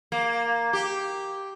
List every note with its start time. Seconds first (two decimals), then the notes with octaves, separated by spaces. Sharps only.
0.12 A#3
0.73 G4